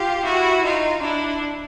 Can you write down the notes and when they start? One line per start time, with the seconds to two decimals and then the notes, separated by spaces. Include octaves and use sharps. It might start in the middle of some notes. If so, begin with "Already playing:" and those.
Already playing: F4 G4
0.24 E4 F#4
0.63 D#4 F4
1.01 D4 E4